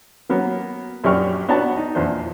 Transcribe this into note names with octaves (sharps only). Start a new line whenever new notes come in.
F#3 A#3 B3 C#4
A#1 F#2 G4 D5 C#6 F6
B3 D4 F#4 C#5 A5
D#4
E2 A#2 F3 D4 C5